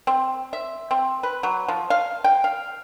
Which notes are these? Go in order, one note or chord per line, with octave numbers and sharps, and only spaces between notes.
C4
E5
C4
B4
F#3
F3
F5
G5
F5